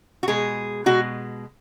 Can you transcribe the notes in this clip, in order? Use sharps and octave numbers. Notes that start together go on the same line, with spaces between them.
F#4
B2 G#3 G#4
B2 G#3 F#4